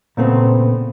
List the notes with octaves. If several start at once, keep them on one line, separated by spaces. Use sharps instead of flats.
A#2 C#3 A3 B3 C4